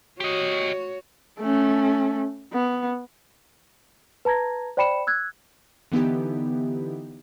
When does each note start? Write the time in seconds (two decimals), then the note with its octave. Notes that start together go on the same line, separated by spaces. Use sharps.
0.20 F#4 G4 C#5 D#5
1.40 A3 C#4
2.53 B3
4.25 B4 A5 A#5 G#6 A#6
4.77 C5 D5 G5 B5 C#7 E7
5.07 E6 F#6 G#6
5.92 D3 E3 B3 D#4 E4 G4